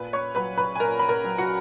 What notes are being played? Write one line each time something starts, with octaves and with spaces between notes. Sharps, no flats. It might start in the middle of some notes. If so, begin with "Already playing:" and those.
Already playing: A#2 B4 B5
C#5 C#6
F#3 B4 B5
B4 B5
G#5
A#2 A#4 A#5
B5
A#4 A#5
F#3
F#4 F#5